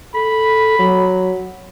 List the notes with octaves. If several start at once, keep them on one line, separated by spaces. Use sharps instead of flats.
A4 B5
F#3